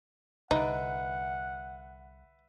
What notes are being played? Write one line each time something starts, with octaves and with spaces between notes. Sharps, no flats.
C2 D3 D#4 B4 E5 F#5